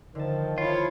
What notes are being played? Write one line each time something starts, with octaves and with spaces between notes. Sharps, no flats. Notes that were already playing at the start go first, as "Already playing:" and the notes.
D3 D#3 F3 A5
F3 E4 F4 C#5